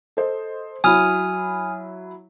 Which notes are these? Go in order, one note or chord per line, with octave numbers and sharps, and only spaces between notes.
A4 C5 D#5
F#3 E4 G#5 D#6 F6